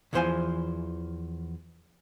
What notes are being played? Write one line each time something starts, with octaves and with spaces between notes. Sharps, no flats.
E2 E3 F3 C5 F5 G#5